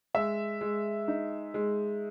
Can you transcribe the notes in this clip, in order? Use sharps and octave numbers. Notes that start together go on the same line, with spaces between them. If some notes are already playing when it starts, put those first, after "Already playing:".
G#3 E5
G#3
D#4
G#3